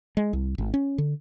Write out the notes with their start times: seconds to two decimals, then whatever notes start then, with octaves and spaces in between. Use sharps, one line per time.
0.17 G#3
0.33 C2
0.58 G#1
0.74 C#4
0.98 D3